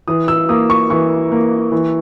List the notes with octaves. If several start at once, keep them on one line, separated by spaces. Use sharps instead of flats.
E3 D#6
E6
A#3 D#6
C#6
E3 C#6
A#3
E3